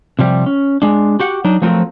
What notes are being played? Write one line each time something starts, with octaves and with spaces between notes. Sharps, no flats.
C3 F3 G3 G4
C#4
G#3 D4
F#4 G4 F#5
F#3 D4 D#4
F3 F#3 A3 C4 F4 A#4